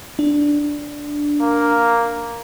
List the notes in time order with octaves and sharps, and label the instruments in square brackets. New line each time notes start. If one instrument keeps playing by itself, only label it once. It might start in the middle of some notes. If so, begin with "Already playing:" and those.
[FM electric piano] D4
[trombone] A#3